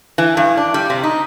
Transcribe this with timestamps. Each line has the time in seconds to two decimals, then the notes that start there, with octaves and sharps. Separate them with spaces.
0.18 E3
0.37 G2
0.57 D4
0.74 G3
0.90 C3
1.03 D#4